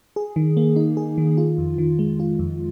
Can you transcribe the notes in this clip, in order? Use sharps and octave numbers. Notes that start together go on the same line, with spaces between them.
G#4
D#3
A#3
D#4
G#4
D#3
F4
F2
D#3
G#3
F4
F2